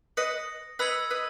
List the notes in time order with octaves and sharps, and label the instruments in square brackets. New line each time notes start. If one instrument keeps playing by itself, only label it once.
[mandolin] B4 D#5 [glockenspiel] D#6 A#6 C#7
[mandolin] B4 D#5 [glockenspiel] B5 E6 G#6 C#7 F#7
[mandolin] B4 D#5